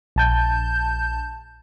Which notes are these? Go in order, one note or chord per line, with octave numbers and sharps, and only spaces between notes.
A#1 A5 G6